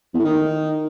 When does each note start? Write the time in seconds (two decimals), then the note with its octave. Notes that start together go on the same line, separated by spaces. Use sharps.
0.14 E2
0.19 A2
0.24 D#3